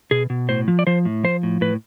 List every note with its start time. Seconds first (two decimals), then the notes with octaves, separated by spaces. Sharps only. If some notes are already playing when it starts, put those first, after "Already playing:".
0.11 B2 G#4
0.30 B2
0.49 A2 C5
0.68 F3
0.79 D5
0.87 F3 C5
1.05 A2
1.24 F3 C5
1.43 A2
1.61 A2 B4